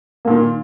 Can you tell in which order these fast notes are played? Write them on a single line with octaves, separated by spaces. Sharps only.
A#3 A#2 D#3